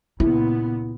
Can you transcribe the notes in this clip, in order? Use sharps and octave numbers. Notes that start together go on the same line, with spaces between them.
C#2 A#2 B3 E4